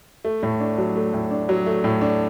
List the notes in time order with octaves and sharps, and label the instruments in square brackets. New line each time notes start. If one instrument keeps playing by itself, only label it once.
[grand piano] A3
A2
D4
F#3
A3
A2
D4
F#3
A3
A2
D4